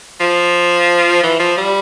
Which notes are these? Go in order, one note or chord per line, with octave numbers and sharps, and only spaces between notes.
F3
E3
F3
G3